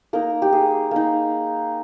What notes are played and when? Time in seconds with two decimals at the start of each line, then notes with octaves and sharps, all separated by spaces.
0.13 A#3 D#4 A#4
0.42 G4
0.53 G#4
0.91 A#3 D#4